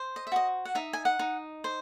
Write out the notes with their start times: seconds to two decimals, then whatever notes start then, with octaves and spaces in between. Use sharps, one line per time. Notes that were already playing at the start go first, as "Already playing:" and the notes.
Already playing: C5
0.16 D#5
0.27 E5
0.32 F#4 D#5
0.65 F#5
0.75 D#4 E5
0.93 G#5
1.05 F#5
1.19 D#4
1.64 C5